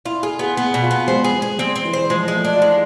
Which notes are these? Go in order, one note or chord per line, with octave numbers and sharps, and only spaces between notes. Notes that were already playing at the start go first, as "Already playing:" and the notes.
E4 F4
F4 G#4
B3 G#4
B3
B2
F4
B3
G#3 C5
G#4
G#3
G#4
G#3 C4
C4
E3
C5
F3 G#3
G#3
A3
D4
F4
G#3 E4